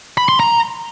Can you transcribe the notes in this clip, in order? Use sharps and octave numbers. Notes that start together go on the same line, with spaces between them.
B5
C6
A#5